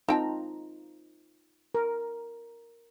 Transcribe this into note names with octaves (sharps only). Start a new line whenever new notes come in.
C4 D#4 F4 G5 A5 A#5
A#4